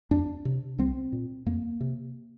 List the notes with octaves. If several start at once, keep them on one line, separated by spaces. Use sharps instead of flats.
F2 D4
C3
C2 C4
A#2
F2 A#3
C3